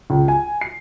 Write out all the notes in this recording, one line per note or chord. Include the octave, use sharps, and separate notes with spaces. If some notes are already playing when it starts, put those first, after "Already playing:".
C#2
G#5
C7